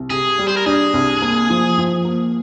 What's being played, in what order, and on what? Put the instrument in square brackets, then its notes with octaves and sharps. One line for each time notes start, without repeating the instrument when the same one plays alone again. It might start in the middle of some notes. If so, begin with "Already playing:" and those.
Already playing: [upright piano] C2
[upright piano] C3 [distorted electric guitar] G#4
[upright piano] G3
[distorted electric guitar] C5
A#4
[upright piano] D4 [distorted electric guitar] G#4
[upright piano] C2
A#3
F3
F3
A#3